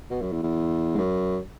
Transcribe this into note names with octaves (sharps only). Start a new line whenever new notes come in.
B2
F#2
E2
E2
G#2
F#2